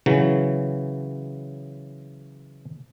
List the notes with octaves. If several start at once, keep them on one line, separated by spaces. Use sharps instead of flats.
C#3 E3 F#3